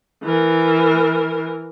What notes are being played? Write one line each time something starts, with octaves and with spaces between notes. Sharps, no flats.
E3 A#4